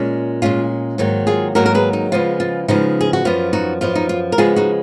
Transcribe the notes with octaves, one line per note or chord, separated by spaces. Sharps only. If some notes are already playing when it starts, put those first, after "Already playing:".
Already playing: A#2 G#3 C#4
A#2 G#3 C#4 F4
G#2 D#3 F#3 A#3
F4 G#4
G#2 D#3 F#3 A#3 F#4 A#4
A#4
G#4 B4
D#4
C#3 F3 G#3 B3 F4
F4
C#3 F3 G#3 B3 D#4
G#4
F#4
F#2 F3 B3 F4
D#4 F#4
F#2 F3 B3 F4
D#4
F4
A#4
C#3 F3 G#3 B3 F4 G#4
D#4 F#4